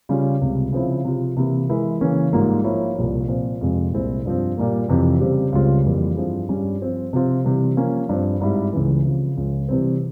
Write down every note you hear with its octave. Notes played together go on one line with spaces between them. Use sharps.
C#3 G3 C#4 F4
C#2 C3 G3
C#3 F3 C4 E4
C3 F3 C4 F4
C3 E3 A#3 E4 G4
E3 G#3 E4 A#4
C#3 E3 A#3 C#4
G#2 G3 A#3 F4
F3 A#3 E4 A#4 C#5
C2 A#2 F3
A#2 F3 C4
F2 C3 F3 G#3
C2 A#2 G#3 C4 E4
G2 F3 C4
A#2 G3 A#3
F2 C3 E3
C#3 G3 C4 G4
C#2 C#3 G3 C4 F4
F2 E3 G3 A#3
G2 F3 C4 E4 G#4
G2 G3 C#4
F3 C4 F4
C3 F3 C4 F4
C3 E3 G3
F3 A#3 C#4
G2 F3 C4
G#2 G3 C4 E4
C#2 C#3 E3
C#3 F3 C4
C#2 C#3 F3
C3 E3 G3 C4